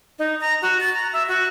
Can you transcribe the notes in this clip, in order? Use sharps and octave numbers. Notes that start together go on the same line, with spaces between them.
D#4
A#5
F#4
A6
A#5
E5
F#4